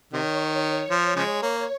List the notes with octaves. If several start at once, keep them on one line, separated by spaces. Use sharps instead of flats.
C3 D#3 C#5
F3
C#3 F3 G#3
A#3